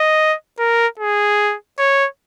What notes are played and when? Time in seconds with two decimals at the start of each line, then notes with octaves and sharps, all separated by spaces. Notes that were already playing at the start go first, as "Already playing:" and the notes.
Already playing: D#5
0.59 A#4
0.99 G#4
1.79 C#5